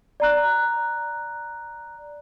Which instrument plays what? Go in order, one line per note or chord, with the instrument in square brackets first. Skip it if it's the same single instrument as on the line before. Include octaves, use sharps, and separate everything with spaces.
[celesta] D5 A#5 F#6